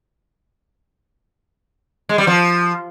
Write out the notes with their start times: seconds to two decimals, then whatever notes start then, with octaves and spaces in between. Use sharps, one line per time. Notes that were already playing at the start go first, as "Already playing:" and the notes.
2.09 G#3
2.18 G3
2.27 F3